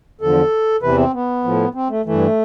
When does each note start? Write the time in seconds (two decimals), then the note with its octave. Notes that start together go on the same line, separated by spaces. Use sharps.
0.21 E2 D3 F3 A4
0.82 E2 C3 E3 B4
0.98 C4
1.13 B3
1.44 A2 F3
1.75 C4
1.90 A3
2.06 G2 E3 A3